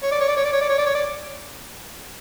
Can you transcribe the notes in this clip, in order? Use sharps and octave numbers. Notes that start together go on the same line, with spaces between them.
C#5
D5
C#5
D5
C#5
D5
C#5
D5
C#5
D5
C#5
D5